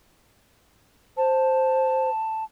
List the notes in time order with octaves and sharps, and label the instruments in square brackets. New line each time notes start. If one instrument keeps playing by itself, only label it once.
[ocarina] C5 [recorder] A5